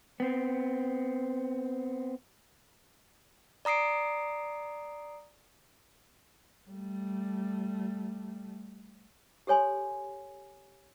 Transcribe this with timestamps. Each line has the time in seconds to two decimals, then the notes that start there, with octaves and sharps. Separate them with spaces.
0.20 B3 C4
3.65 D5 A#5 D#6 C7 D7
6.70 G3 A3
9.47 G4 A4 C#5 G#5 C6